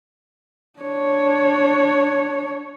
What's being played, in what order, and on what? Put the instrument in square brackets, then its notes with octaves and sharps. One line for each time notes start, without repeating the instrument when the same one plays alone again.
[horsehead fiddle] D4 C#5